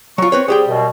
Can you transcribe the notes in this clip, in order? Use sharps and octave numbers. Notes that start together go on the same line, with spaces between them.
F#3 F4 C#6
C4 B4 C#5
G3 C4 G4 G#4 G5
F#2 B2